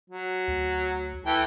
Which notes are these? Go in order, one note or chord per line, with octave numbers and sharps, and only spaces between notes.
F#3
D2
E3 A4 G5